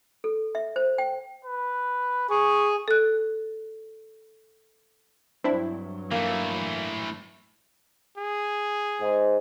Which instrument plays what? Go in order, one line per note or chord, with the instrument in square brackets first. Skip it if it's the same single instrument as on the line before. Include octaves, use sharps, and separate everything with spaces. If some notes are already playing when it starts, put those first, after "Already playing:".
[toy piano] A4
E5
C5
G5
[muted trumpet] B4
[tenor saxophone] G#4 [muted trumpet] C#6
[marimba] A4 F#6
[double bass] G2 F#3 [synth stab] C4 D4 E4
[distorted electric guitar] E3 A3 [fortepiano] A#3
[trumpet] G#4
[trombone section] G#2